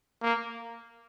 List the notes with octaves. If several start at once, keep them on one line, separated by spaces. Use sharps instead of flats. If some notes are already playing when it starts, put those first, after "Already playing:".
A#3